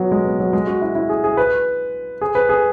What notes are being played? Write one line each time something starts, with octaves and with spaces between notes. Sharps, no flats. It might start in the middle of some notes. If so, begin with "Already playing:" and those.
Already playing: F#3 B3
G#3
B3
F#3
G#3
F#4
E4
E4
G#4
G#4
B4
G#4
B4
G#4